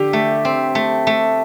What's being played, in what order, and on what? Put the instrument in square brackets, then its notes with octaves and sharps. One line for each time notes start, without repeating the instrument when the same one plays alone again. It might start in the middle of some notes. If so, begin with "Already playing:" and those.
Already playing: [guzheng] D3 [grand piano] G4
[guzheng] A3
C4
A3
A3